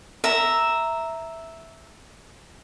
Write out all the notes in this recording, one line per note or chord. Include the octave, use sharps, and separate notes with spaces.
E5 A#5